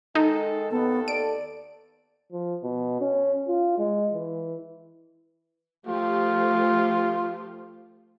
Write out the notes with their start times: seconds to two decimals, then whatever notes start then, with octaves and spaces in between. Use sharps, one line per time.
0.15 D#3 G#3 D#4 A4
0.71 D#2 B3 A4
1.08 D5 D7
2.32 F3
2.63 B2
3.01 C#4
3.48 F4
3.79 G#3
4.13 E3
5.87 F3 A3 F4 G4